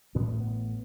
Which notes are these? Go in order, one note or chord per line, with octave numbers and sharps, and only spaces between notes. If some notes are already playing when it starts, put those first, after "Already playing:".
A1 A2 B3
A3
B3